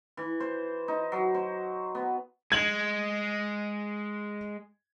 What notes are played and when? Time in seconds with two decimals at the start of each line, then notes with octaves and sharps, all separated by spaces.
0.17 E3
0.40 C5
0.88 D#4
1.12 F#3
1.35 C5
1.95 B3
2.52 G#3 G#6 F#7